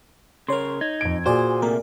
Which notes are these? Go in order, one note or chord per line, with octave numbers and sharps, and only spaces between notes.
C#3 A#4 C#5 C6
D#4 G#6
F2 D7
A#2 F#4 G#4 C5 D5 G#5
C3 A3 A#3 A#4